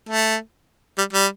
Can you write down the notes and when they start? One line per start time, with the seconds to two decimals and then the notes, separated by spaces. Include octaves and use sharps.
0.09 A3
0.98 G3
1.13 G3